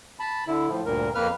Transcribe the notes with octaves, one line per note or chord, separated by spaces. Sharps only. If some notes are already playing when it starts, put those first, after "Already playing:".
A5 B5
D3 E4
A2 F3
D2 G2 A#2 A#4
F2 A#3 B4 F6